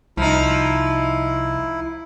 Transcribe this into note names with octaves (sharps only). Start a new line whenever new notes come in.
C2 F3 D#4 E4